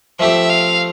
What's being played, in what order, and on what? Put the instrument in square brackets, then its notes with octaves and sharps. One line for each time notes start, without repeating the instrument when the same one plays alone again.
[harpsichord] F3 A3 C4 G4 [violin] E5
[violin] F5